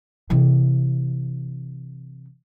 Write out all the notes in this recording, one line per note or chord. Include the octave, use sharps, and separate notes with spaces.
C3 E3